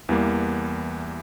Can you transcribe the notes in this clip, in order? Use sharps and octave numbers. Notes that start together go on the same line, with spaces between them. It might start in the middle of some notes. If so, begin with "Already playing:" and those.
E2 E3 G3 A#3